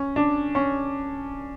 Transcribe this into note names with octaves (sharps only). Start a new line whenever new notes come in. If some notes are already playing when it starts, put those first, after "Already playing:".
Already playing: C#4
D4
C#4